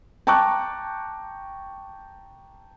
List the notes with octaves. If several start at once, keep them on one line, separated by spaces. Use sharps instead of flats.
G5 A5 A#5 C#6 D6 F#6